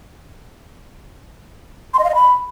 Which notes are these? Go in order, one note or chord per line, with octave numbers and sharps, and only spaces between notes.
C6
D#5
F5
D#5
B5